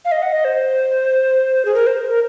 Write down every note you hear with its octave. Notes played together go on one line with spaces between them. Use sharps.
F5
D#5
F#5
D#5
C5
G#4
A#4
C5
A#4